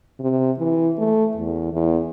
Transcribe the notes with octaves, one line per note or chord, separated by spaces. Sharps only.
C3
E3
A3
E2
E2